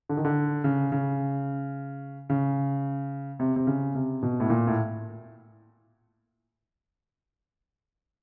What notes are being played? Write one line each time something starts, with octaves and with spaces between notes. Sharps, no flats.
D3
D#3
D3
C#3
C#3
C#3
C3
C3
C#3
C3
B2
A2
A#2
A2